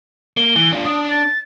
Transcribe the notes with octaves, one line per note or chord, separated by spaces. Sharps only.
A#3 G7
E3
D4 F4
D4 D#6
A6